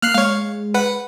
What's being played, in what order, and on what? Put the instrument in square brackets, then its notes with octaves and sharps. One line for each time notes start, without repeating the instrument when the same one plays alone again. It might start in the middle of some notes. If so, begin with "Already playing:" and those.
[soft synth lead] A#3 [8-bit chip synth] F6 F#6 C7
[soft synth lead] G#3 [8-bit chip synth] C#5 F5
[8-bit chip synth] B4 F#5